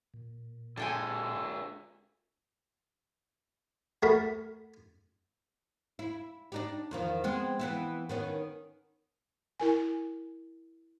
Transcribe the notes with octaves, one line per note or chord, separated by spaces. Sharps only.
A#2
D3 G#3 A4 G5 G#5 E6
A3 F#4 A4 A#4 B5
E4
D4 D#4 G4
E2 D#3 F3
G#3 B3 C4
E3 B3 E4
D#3 B3 C#4
E4 A#4 G#5